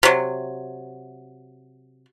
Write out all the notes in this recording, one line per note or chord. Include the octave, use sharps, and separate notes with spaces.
C3 F#3